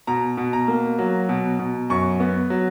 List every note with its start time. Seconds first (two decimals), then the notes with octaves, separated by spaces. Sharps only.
0.07 B2 A#5
0.37 B2
0.53 A#5
0.68 A#3
0.99 F#3
1.29 B2
1.59 B2
1.90 F#2 C#6
2.20 B3
2.50 F#3